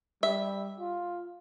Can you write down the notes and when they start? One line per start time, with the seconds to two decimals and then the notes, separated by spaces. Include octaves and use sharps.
0.23 G3 E5
0.80 F4